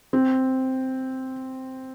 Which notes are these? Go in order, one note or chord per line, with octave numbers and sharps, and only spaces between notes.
C4